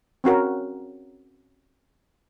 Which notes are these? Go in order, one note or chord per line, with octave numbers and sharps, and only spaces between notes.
C4 C#4 F#4 A#4